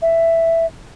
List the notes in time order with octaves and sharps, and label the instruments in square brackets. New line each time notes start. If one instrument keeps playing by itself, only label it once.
[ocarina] E5